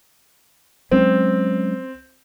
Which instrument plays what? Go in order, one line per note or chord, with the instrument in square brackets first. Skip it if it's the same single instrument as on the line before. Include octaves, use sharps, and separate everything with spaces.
[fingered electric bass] F#3 G#3 C#4 [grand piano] C4